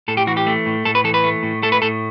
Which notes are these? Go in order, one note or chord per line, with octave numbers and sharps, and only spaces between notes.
A2 A4
G4
E3 F#4
G4
A3
A2
A2 A4
B4
E3 A4
B4
A3
A2
A3 A4
B4
A2 A4